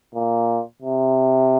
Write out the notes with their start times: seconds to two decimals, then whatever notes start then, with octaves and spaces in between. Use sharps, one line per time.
0.14 A#2
0.82 C3